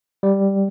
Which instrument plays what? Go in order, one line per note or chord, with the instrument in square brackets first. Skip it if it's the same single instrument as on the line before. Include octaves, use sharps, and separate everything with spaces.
[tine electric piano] G3